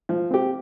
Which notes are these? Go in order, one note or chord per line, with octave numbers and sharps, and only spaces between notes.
F3
C4 G4